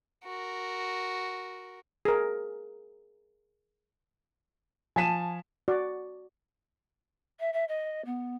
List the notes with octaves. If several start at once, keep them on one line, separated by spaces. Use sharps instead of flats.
F#4 A#4
G#4 A#4
F3 G#5 A5 B6 D#7 E7
F#4 D5
E5
E5
D#5
B3